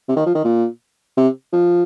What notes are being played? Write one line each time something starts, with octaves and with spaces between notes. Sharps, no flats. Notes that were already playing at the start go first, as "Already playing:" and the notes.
C3
D#3
F3
D#3
A#2
C3
F3